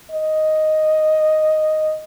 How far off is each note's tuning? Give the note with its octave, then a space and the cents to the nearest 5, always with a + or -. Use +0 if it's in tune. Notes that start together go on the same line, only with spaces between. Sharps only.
D#5 +0